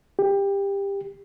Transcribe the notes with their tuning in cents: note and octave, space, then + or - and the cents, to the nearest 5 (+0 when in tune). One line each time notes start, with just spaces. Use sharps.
G4 +20